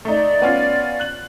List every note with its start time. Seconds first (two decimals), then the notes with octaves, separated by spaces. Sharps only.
0.05 A3 D#4 D5
0.42 B3 C#4 F4
0.99 F#6 F#7